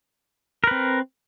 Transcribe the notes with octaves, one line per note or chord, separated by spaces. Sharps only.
C4 A#4 B4